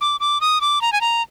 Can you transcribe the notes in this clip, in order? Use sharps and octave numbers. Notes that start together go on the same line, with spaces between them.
D6
D6
D#6
D6
A#5
G#5
A#5